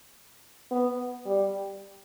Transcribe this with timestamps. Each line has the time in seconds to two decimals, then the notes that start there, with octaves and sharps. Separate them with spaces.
0.71 B3
1.26 G3